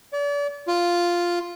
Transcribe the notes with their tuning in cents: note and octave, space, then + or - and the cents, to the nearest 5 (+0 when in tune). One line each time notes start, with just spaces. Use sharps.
D5 -40
F4 +0